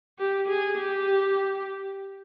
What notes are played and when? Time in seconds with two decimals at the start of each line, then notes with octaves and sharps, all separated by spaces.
0.19 G4
0.49 G#4
0.79 G4